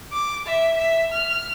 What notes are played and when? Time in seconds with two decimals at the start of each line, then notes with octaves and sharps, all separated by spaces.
0.12 D6
0.47 E5
0.77 E5
1.12 F6